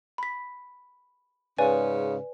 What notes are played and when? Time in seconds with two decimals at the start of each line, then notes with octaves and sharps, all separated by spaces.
0.18 B5 B6
1.58 G#2 C#3 B4 D5 G#5